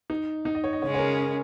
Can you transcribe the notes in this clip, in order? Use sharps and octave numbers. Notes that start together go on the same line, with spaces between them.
D#4
D#4
D#5
C#5
D#5
C#3 G#3 C#4 C#5
C#5
A#4